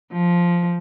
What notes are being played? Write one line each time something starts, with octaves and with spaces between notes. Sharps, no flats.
F3